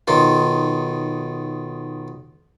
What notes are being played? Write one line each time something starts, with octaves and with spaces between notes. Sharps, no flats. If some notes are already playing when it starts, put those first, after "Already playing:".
B1 D#3 F4